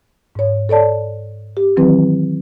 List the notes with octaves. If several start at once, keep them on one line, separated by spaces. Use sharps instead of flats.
G#2 C#5
A4 C#5 D5 A5
G4
D#3 E3 F#3 C4 E4 B4